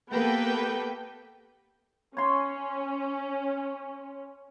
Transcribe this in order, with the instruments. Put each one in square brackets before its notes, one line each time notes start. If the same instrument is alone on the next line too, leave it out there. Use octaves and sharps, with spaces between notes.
[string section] A#3 B3 G4 A4 B4 G5
[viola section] C#4 [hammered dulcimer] C#5 C6